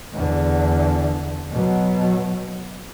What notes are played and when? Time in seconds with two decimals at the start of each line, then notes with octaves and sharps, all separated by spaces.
0.13 E2 D3
1.50 B2 F#3